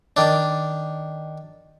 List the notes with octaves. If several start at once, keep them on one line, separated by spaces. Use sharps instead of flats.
D#3 D4